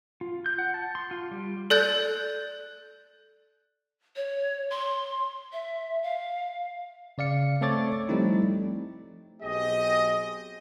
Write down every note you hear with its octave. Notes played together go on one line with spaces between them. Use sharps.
F4
G6
F#5
A5
C6
F4
G3
A4 D5 F#6 G6 A6
C#5
C6
E5
F5
C#3 D5 F5 C#7
A3 C4 A4 C#5 D6 A6
F3 G3 A3 C4 D#4 E4
B1 C4 G4 G#4 D#5